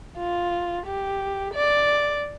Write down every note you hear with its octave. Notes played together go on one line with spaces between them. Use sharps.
F4
G4
D5